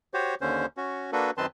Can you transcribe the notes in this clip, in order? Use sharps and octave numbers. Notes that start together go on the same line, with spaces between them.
F#4 G4 C5 C#5
D#2 D3 C#4 C5
C#4 F#4
A#3 D4 F#4 A4 B4
F#2 D#3 C4 B4 A5 C6